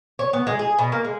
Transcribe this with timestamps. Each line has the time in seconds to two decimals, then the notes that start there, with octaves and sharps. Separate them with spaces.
0.19 C#5
0.33 B3
0.47 G#3
0.59 G#4
0.79 B2
0.92 A#3
1.05 G#3